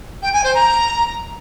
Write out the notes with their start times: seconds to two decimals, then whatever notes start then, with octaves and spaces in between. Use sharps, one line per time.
0.22 G5
0.33 G#5
0.43 C5
0.54 A#5